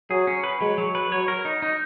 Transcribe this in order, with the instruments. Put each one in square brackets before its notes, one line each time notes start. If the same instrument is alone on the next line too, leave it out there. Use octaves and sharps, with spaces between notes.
[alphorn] F#3 [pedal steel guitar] G#4
[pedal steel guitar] C#4
B4
[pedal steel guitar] F#3 [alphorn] G#3
[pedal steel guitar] F#3
B4
[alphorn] F#3 [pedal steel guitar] C#5
[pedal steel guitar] A#4
D#4
D#4